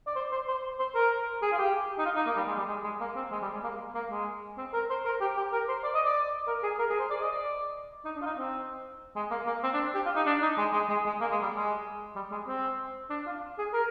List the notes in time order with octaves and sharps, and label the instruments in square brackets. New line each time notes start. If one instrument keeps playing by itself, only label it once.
[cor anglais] D5
C5
C5
C5
C5
A#4
G#4
F4
G4
D#4
F4
D#4
A#3
G3
G#3
G3
G#3
G#3
A#3
C4
G#3
G3
G#3
A#3
A#3
G#3
C4
A#4
C5
A#4
G4
G4
A#4
C5
D5
D#5
D5
A#4
G#4
A#4
G#4
C5
D5
D#5
D5
D#4
D4
F4
D#4
C4
G#3
A#3
A#3
C4
D4
G4
F4
D#4
D4
D#4
G#3
G#3
G#3
G#3
A#3
G#3
G3
G#3
G3
G#3
C4
D4
F4
G#4
A#4